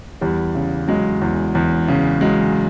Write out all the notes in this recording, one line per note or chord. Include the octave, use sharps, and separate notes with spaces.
E2 G3
C#3
F#3 G#3
E2
E2
C#3
F#3 G#3